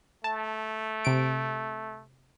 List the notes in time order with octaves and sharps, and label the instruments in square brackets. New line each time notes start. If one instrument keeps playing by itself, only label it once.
[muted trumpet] A3 [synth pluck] A5
[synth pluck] C3 D7